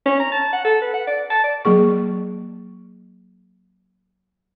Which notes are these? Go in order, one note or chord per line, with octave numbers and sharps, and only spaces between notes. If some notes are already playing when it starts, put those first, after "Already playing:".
C#4
A#5
A5
F#5
A4
B4
F#5
D5
A5
D5
F#3 A#3 G#4 C#6